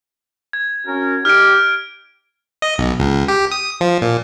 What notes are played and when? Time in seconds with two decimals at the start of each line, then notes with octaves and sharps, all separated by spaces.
0.53 G#6
0.86 C#4 F#4 A#4
1.25 D#4 G4 F6 D7
2.62 D#5
2.78 B1
2.99 C#2
3.28 G4
3.51 D#6
3.81 F3
4.02 A#2